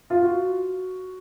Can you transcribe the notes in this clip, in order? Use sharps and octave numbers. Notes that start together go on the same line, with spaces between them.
F4
F#4